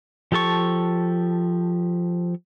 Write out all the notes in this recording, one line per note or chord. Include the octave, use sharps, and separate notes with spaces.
F3 G4 A4 A5 C#6